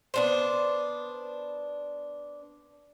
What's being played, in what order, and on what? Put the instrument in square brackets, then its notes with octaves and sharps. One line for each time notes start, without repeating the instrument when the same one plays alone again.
[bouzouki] B3 D4 C5